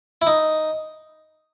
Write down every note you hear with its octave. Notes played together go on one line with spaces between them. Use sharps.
E4
D#4